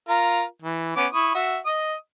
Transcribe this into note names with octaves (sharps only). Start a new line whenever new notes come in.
F4 A#4 A#5
E3
B3 C#4 D6
E4 C#6 D#6
F#4 E5
D#5 D#6